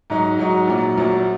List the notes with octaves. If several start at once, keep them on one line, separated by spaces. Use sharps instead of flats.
G#2 F#3 D#4 F#4
G#2 F#3 D#4 F#4
A#1 A#2 F#3
A#1 A#2 F#3